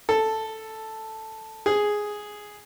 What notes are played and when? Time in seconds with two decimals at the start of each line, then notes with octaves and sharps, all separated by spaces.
0.09 A4
1.66 G#4